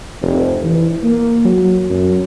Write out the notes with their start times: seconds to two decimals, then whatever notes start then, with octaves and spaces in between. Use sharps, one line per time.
0.21 F1
0.64 E3
1.04 A#3
1.45 F#3
1.90 F#2